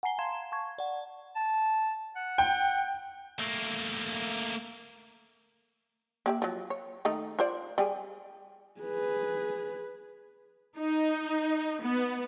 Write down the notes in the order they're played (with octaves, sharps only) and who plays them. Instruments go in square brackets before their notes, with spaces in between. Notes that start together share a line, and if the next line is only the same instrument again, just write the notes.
[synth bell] F#5 G#5 A#5 C7 G7
F5 A5 A#5 C6 G#6 E7
A5 C#6 G#6
D5 F#5
[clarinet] A5
F#5
[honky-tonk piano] G5
[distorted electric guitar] A3 A#3
[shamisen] A#3 G4 E5
F3 F#3
C#5
D#3 A3 D#4
F4 C5 D5
G3 G4 G#4
[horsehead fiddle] G#4 B4
[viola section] D#4
B3